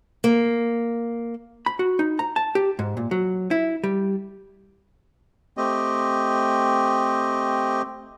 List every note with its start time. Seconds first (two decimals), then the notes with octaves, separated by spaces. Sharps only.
0.24 A#3
1.66 B5
1.79 F#4
1.99 D#4
2.19 A#5
2.36 A5
2.55 G4
2.79 G#2
2.97 A#2
3.11 F#3
3.51 E4
3.84 G3
5.57 A3 C4 G4 D#5